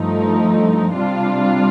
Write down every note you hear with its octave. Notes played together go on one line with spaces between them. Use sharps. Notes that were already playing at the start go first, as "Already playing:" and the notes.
Already playing: G2 F3 A3 D#4
C3 G3 D4 F4